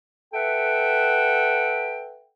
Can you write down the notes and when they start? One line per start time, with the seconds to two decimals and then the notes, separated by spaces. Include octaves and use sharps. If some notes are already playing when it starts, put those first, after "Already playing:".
0.34 A4 B4 E5 F#5 G5